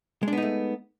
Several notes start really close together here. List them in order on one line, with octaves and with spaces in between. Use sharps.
G#3 D4 B3 D#4 A3